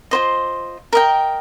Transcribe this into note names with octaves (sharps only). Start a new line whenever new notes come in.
F4 C5 D#5
A#4 D#5 G5